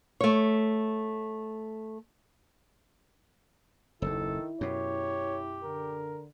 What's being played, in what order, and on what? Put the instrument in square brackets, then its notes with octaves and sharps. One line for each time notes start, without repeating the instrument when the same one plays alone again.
[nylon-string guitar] A3 C#5
[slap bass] F#1 D#2 [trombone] D#3 [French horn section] E4 [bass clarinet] A4
[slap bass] F#2 B2 [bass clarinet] G4 [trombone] C#5
[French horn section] D3 [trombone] A#4